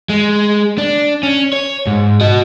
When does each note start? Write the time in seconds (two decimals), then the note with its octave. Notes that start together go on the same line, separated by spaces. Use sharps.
0.09 G#3
0.78 D4
1.23 C#4
1.53 C#5
1.87 G#2
2.21 F#4 D#5